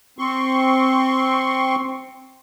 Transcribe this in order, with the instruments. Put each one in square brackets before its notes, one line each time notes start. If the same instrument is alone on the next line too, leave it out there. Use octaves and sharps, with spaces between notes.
[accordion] C4 C6 C#6